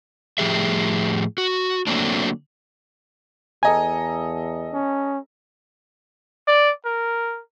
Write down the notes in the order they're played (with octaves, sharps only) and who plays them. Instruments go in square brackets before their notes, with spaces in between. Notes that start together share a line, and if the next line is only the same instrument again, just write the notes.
[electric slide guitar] A2 F3 C4 G4 G#4 E5
F#4
D3 F#3 A3 A#3 C4 D4
[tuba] E2 [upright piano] A4 D#5 A#5 [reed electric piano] G#5
[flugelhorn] C#4
[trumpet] D5
A#4